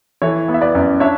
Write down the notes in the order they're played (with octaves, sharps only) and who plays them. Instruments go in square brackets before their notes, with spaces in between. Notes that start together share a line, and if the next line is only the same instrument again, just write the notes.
[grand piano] E3 [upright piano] A4 C#5
[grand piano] B3
[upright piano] E5
B4 D5
[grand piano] F#2
[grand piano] D4 [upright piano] C#5 E5